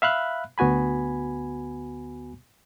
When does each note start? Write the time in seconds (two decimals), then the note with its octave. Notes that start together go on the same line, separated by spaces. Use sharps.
0.02 E5 F5 B5 F#6
0.58 D2 B3 F#4 G#5 B5